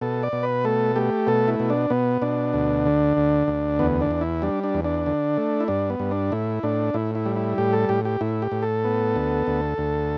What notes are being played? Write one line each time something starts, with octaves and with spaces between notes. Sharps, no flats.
B2 A4
D5
B2
B4
A3 A4
A3 G4
B2 A4
E4
B2
D4
B2 B3
B2 D4
D2
D3
D2
D2
E2 B3
D4
E2
E4
G3 D4
D4
E2
D4
D3
A3
E4
G2 D4
B3
G2
D4
A2 E4
A2 D4
A2 E4
E4
G3
E4
A2 G4
A4
A2 G4
G4
A2 E4
G4
A2
A4
B3
D2
D2
D2